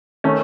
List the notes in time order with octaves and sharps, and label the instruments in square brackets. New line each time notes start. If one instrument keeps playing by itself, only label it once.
[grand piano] D#3 A3 C#4